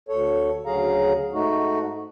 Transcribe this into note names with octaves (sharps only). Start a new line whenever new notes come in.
D2 A4 C#5
D2 C#3 F#3 G#4 F5 A#5
G#2 A3 D#4 F#4